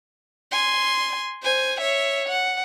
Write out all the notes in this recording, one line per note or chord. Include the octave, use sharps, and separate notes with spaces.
G#5 C6
C5 G#5
C#5 E5
F#5